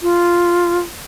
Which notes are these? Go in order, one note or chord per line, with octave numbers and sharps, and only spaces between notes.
F4